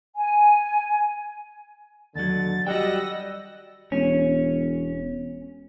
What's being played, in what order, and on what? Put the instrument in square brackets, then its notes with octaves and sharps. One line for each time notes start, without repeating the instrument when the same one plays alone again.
[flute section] G#5
[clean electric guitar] D#2 F#3 [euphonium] D3 [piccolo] A6
[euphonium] G3 [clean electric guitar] F#4 G5 [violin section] D#5 E6 A#6 [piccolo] F#5
[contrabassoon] E1 [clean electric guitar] C#4